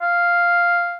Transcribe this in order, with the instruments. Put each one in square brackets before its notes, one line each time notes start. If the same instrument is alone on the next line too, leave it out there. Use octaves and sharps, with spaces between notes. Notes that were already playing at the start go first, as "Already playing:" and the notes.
[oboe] F5